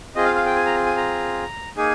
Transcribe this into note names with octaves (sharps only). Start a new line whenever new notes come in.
C4 F4 G#4 D#5
F5
F5
G5
G#5
A#5
G#5
A#5
A#3 D#4 G#4 G#5